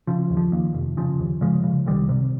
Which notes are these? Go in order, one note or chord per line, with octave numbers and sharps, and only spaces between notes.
C#3 F3
D#2
F3
D#2
F1
C#3 F3
D#2
C#3 F3 G#3
C#3
C2 D#3 G3
C3